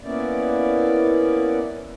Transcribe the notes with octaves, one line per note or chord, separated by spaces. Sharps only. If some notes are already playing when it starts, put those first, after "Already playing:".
A#3 B3 C#4 E4 D5